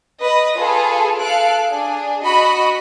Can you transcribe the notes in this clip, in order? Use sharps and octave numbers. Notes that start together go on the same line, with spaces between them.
B4 D#5
F4 G#4 A4 B4
A4 F5 F#6 D7
D4 G#4
F#4 D#5 B5